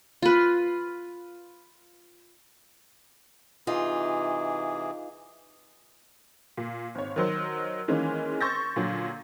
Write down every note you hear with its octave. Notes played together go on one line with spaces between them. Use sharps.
F4 B4
C3 E3 D#4 F4 G#4
A#2
G#1 C#5
D#3 F#3 C5
D#3 E3 G#3 A#3 C#4
C6 C#6 E6 G6 A6 A#6
A#2 D3 F#3